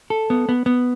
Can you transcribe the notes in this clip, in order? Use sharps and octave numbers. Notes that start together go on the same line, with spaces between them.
A4
B3
B3
B3